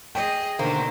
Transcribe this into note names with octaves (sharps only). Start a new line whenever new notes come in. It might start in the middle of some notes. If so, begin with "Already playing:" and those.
G#4 D#5 G5
B2 D3 D#3 A#3 C5